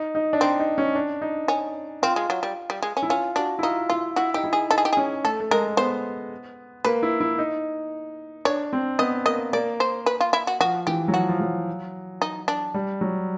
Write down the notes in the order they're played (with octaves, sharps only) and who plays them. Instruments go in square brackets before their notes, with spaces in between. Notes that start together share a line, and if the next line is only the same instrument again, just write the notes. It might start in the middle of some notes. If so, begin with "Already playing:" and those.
Already playing: [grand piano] D#4
D#4
D4
[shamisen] C4 [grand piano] D#4
[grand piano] D#4
C#4
D4
D#4
[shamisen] C#4
[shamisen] C4 [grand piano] F4
[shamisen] G#3
F#3
G3
G3
G#3
C#4
[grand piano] E4
[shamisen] C#4 [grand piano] F4
[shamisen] D4 [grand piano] F#4
[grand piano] E4
[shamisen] D#4 [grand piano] F4
[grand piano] E4 [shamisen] F4
[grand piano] E4 [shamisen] F#4
[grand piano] D#4 [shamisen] G4
[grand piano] E4
[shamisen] G#4
[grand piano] D#4 [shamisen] A4
[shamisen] G#4
G4
[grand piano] C#4 [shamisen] G#4
[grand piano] A3 [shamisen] A4
[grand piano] A3
[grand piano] G#3 [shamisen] A#4
[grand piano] B3 [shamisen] C5
[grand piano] A#3 [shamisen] B4
[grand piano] E4
E4
D#4
[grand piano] D4 [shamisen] C#5
[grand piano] C4
[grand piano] B3 [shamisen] D#5
[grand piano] A#3 [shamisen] D#5
[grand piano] A#3 [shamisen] D5
[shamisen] C5
B4
F4
E4
F#4
[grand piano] F3 [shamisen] F#4
[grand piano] E3 [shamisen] G4
[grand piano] F#3
[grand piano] F3 [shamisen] F#4
[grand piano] F3
F#3
[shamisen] D#4
D4
[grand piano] G3
F#3